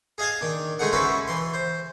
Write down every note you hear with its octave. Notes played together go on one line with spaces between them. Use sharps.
G#4 D#5 F5 G#5 A5
D#3 D4
D3 G#3 A3 D#4 G#4 F#5
C#4 E4 F#4 A4 B4 C5
E3 C6
C5